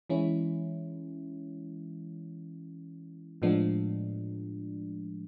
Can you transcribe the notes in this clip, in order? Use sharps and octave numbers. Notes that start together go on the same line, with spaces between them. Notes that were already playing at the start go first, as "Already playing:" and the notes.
E3 G#3 C#4 E4
A2 F3 G#3 B3 D4